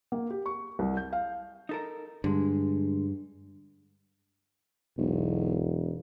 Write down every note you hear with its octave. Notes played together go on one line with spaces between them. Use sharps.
A#3
G4
C#6
C2
G6
F5
D#4 A4 A#4
G2 D3 G#3
E1 B1